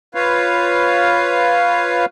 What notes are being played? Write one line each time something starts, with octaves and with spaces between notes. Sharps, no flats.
F4 B4 C#5 F5